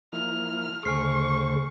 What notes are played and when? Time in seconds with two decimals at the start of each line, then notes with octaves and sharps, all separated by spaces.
0.13 F3 A#3 E4 F6
0.85 D2 C#3 A3 C5 G#5 C#6 F6 C7